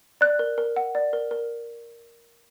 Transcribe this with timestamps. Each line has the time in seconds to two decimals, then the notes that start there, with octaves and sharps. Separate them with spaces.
0.21 D5 F#6
0.39 A#4
0.58 A#4
0.76 F#5
0.95 D5
1.13 A#4
1.31 A#4